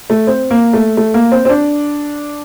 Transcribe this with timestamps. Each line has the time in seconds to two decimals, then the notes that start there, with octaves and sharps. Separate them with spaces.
0.10 A3
0.27 C4
0.51 A#3
0.73 A3
0.97 A3
1.14 A#3
1.32 C4
1.45 C4
1.49 D4